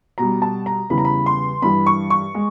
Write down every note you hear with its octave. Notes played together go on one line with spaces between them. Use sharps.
B2 G3 A#5
A5
A#5
E2 C#3 E3 G3 B5
A#5
B5
C6
G2 E3 G3 B5
C#6
C#6
G#3